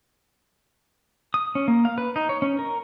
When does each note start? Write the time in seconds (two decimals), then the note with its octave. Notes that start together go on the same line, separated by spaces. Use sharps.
1.34 D#6
1.55 C#4
1.68 A#3
1.85 F5
1.98 B4
2.16 D#4
2.29 C#5
2.42 C#4
2.59 A#4